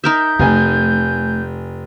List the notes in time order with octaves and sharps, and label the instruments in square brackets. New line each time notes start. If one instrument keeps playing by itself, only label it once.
[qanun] D#4 A#4 E5 [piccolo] G6
[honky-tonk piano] F1 G#5 [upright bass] A3